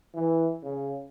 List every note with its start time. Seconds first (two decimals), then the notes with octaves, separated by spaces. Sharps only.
0.14 E3
0.62 C#3